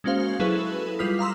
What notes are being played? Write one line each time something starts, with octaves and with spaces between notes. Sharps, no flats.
G#3 A#3 C#4 F#4 C5 F5
F#3 E4 G#4 A4 B4
G3 F4 B4 D#6 F6 B6
F5 A#5 C6 E6